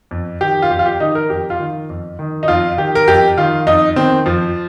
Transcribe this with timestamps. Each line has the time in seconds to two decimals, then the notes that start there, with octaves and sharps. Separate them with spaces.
0.11 F2
0.41 D#3 G4
0.62 F4
0.70 F2 G4
0.79 F4
0.86 G4
1.00 D#3 D#4
1.15 A#4
1.30 F2 G4
1.50 F4
1.59 D#3
1.89 F2
2.19 D#3
2.43 D#4
2.48 F2 F4
2.78 D#3 G4
2.95 A#4
3.07 F2 G4
3.37 D#3 F4
3.67 F2 D#4
3.96 D#3 C4
4.26 F2 F3